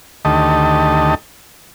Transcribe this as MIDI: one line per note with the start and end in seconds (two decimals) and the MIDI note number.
0.25 1.15 38
0.25 1.15 51
0.25 1.15 57
0.25 1.15 67
0.25 1.15 75
0.25 1.15 81